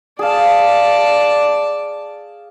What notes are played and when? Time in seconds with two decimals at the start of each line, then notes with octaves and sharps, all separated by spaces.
0.19 G#4 D5 F5 A5